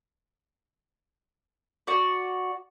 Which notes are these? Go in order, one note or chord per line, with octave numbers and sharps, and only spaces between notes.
F#4 D5